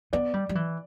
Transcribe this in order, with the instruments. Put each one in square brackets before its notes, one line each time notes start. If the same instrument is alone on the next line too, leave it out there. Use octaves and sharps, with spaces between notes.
[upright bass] B3 [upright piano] D5
[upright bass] G3
G3
E3